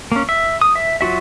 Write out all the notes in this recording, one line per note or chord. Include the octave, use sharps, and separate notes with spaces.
A#3 C#4
E5
D#6
E5
F#3 F4 F#4 E5